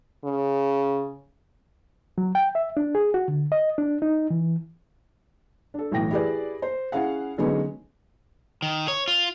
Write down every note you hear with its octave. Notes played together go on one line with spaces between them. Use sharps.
C#3
F#3
G5
E5
D4
G#4
F#4
D3
D#5
D4
D#4
E3
D4 A4
B1 A2 E3 G5 A#6
E4 G4 G#4 B4 D5
C5
C#4 E4 G#4 F5 F#5
D3 F#3 G#3 B3 C#4 D#4
D#3
C#5
F4